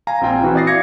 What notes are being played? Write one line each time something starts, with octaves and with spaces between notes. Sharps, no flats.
F5 G#5 A#5
A#1 C4 F4 G5 G#5
E3 C4 E4 F#4
D5 E5 D#6 A6 A#6 C7
F5 D6 G#6 A#6 C#7